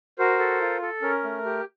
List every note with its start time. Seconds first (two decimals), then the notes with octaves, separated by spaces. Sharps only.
0.19 F#4 A#4 C5
0.39 A4
0.61 F4
0.82 A4
1.02 C#4 A#4
1.24 A3
1.45 G4